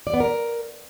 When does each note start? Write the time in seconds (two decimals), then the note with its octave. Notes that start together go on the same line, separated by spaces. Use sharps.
0.07 D5
0.14 B3
0.20 A#4